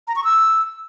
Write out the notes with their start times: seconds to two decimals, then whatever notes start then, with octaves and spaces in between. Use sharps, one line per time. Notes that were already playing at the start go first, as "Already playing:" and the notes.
0.08 A#5
0.16 C#6
0.24 E6